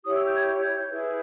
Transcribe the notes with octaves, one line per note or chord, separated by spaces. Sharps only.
E4 G4 C#5 D#6
E6
G6
G#6
G6
G#6
G6
E4 G#4 B4